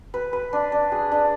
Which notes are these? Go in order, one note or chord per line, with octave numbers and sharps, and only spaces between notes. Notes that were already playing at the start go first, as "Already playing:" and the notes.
B4
B4
D4
D4
G#4
D4